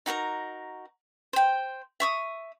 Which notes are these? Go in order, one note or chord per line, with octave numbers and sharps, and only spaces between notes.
D#4 F#4 A#4 A#5
C5 G5
E5 C#6 D#6